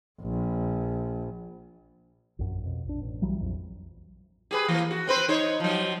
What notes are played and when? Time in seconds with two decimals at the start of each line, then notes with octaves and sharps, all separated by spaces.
0.21 A#1
2.39 A#1 F#2
2.63 F2 B2
2.85 A#1 D4
3.01 A1
3.22 B1 E3 F#3 G3
3.40 A#1 F2
4.51 G4 G#4 B4
4.68 E3 A#3
4.91 F#4
5.07 C4 B4 C5
5.28 D#4 C5 C#5
5.60 F3 F#3